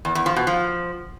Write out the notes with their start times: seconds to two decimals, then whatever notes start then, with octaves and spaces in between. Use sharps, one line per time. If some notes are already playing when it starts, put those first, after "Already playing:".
0.05 E2
0.15 E2
0.26 F3
0.36 B2
0.47 F3